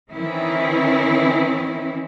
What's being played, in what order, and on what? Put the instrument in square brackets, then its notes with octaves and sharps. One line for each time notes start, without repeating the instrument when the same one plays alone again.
[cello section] D#3 E3 C4 C#4 E4